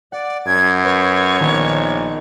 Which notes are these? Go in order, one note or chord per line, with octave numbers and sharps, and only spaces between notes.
D5 F#5
F#2 G#6
B4 C#5
A#1 D#3 B3